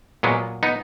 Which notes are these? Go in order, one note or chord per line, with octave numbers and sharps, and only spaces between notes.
A#2 F#3 G#3 B3
B3 D#4